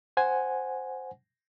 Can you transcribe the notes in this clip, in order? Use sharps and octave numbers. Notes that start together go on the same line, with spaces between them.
C5 F#5 G#5